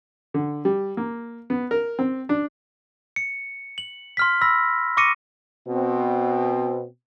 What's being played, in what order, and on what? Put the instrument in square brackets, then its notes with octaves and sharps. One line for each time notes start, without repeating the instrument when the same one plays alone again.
[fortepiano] D3
G3
A#3
B3
A#4
C4
D4
[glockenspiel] C#7
F#7
C6 F6 B6
B5 E6 A#6 B6
C#6 D6 A#6 C#7 D#7
[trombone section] B2 C4